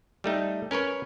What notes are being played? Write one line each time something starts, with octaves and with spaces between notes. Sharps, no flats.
G3 A3 D#4
C#4 A#4 B4 C#5